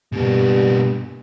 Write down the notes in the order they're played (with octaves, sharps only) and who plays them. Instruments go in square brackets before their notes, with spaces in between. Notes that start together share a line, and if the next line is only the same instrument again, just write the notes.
[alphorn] G2 [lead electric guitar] B2 A#3